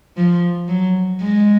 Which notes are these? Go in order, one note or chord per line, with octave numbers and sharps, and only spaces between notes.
F3
F#3
G#3